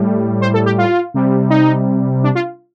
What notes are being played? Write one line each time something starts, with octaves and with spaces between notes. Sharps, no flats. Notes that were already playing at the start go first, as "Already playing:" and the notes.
Already playing: A2 G3
C5
A4
G4
F4
C3 G3
D#4
D4
F4